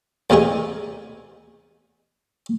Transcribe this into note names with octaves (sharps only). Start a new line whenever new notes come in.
E2 C3 A3 D#4 G#4